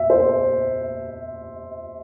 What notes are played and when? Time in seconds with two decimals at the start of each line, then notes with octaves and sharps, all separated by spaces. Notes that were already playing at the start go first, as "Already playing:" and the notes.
Already playing: E5
0.10 C5